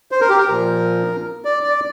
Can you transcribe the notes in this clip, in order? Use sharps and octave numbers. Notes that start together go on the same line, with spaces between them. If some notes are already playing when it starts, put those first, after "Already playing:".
C5
A#4
G4
A#4
A#2 F3
D5
D5